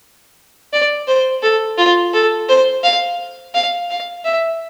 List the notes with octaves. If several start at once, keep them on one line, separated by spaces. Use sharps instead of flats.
D5
C5
A4
F4
A4
C5
F5
F5
F5
E5